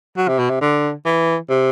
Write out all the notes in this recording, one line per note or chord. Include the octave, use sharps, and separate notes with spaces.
F#3
C3
B2
C3
D3
E3
C3